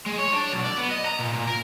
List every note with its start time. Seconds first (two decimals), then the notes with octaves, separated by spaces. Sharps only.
0.07 G#3
0.19 C#5
0.34 D4
0.52 B1
0.64 D5
0.78 B3
0.91 D#5
1.06 A#5
1.19 A#2
1.33 A#2
1.47 A#4